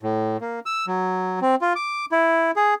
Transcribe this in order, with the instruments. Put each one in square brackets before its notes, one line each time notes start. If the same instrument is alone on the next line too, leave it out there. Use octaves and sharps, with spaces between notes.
[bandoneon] A2
A#3
E6
F#3
C4
F4
D6
E4
G#4